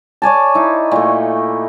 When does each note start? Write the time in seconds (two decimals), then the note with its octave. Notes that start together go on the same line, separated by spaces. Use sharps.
0.22 C#5 D5 G#5 A5
0.55 D#4 E4
0.91 A#2 A3